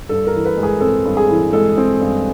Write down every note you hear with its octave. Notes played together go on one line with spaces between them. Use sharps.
G2 A4
A#4
E3
B4
G#3
G#4
C4 A4
G2
G#4
E3
G#3 A4
C4
G2